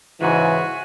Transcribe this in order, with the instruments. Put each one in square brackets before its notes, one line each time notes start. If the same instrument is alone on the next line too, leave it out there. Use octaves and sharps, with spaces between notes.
[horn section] G#2 C#3 [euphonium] E3 [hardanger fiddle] F#4 [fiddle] E5 G#5